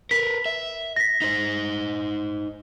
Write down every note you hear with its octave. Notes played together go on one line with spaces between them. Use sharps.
A#4 B4 B6
E5
A#6 B6
D#4 C5